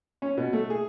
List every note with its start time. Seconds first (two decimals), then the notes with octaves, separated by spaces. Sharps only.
0.22 C#4
0.37 B2
0.53 A3
0.70 G#4